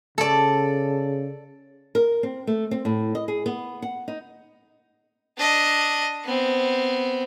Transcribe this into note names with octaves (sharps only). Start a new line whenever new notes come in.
C#3 A4 D5
A#4
C4
A3
C4
A2
D#5
G#4
B3
F#5
D#4
D4 D#5
B3 C4